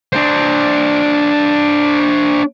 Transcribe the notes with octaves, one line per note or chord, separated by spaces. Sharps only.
D4 C5